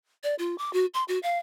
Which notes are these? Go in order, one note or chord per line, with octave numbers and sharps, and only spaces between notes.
D5
F4
D6
F#4
C6
F#4
F5